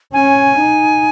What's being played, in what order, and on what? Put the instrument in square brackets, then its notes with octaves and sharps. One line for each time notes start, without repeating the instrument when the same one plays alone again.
[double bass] C#4 [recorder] G#5
[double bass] D#4